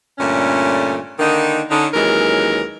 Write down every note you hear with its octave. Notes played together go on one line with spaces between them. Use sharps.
G2 A#2 D3 A3 C#4
D3 D#3 A#3 D#4
D3 C#4 D#4
D#2 E3 F#3 G#3 C#4 A#4